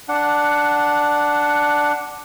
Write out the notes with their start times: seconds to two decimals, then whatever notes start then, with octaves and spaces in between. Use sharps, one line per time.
0.09 D4 F#5